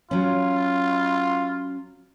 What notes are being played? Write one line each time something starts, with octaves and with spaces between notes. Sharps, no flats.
F#3 C#4 F4